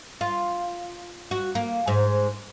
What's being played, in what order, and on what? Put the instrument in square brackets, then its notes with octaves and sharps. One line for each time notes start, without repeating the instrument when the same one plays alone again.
[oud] F4
F#4
A#3
G#2